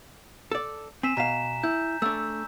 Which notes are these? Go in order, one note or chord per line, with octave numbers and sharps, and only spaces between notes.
A4 D5
C4 G#5 B6 E7
B2 F5 A#5 B6 E7
E4 G6
A3 D4 E6